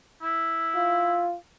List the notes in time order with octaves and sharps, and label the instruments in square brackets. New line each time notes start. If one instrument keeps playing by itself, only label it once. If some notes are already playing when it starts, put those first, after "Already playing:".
[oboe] E4
[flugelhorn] F4